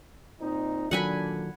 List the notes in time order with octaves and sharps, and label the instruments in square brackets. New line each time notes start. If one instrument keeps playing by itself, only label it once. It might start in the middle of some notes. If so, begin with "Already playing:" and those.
[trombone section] A#2 C4 D#4
[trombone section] A#2 D3 D4 [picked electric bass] D#3 F#3 [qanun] F#5 G#5 B5